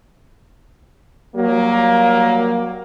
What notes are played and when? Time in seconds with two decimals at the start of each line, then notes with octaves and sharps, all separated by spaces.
1.36 F#3 G3 A#3